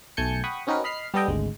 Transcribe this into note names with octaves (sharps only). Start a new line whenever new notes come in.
B1 A3 G#5 A5 G6 C#7
F#5 G5 B5 C#6 D#6
C4 C#4 D#4 F#4 A#4 B4
D#5 B5 F6 C7
G3 B3 A4 D#5 G5
G#1 D2 G#3